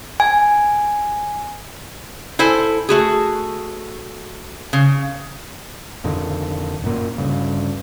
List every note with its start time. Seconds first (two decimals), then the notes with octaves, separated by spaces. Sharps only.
0.20 G#5
2.39 E4 A4 C5 G#5
2.89 A3 F#4 G#4
4.73 C#3
6.04 F2 A#2 D3 D#3
6.82 D1 F#2 A#2 A#3
7.18 D2 G2 C#3